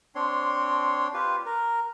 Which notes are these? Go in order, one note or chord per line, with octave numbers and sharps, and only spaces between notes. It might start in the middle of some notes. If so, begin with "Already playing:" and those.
C4 D4 C#5 C6
F4 G4 B4
A#4